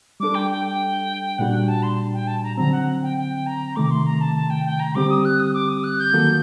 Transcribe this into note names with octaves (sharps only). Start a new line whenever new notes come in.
G3 D4 A4 D6
G5
G5
G5
A#2 G3 D4 F#4 F#5
G5
A5
C6
G5
A5
A#5
D3 F#3 C4 A#5
F#5
G5
G5
A#5
C3 D#3 A3 D6
C6
A#5
A5
A5
G5
G5
A#5
D3 G3 C4 G4 D6
D#6
F#6
D#6
D6
D#6
F#6
G6
D#3 F#3 A#3 F#4 A4